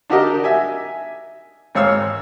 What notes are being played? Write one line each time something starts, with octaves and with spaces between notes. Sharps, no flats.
D4 D#4 F#4 G4 A#4 D#5
E5 G#5
G#1 G#2 C#5 F5 E6 F6